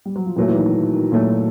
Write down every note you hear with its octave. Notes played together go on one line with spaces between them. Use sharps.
G3
F#3
F3
A#2 E3 F#3 A3
E3
D#3
D#3
D#3
A#2 F#3 A3